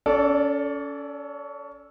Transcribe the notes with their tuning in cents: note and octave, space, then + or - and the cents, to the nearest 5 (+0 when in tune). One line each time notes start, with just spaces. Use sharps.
C#4 +25 A4 +0 D5 -15